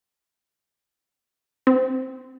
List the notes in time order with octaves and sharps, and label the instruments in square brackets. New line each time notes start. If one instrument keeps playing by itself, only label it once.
[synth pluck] C4